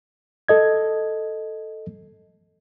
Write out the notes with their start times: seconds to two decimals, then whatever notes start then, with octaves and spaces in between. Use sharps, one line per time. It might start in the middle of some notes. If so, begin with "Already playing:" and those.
0.48 A4 D#5 G#6